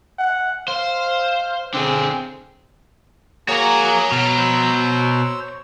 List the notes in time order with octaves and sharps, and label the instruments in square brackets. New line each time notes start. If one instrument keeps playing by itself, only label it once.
[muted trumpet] F#5
[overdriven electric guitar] C5 [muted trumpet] F5
[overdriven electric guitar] D3 G#4 [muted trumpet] C4
[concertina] A#3 G#4 [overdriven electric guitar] F#4 [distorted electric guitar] C#5 A#5
[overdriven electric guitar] B2 [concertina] F6
[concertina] C5 E6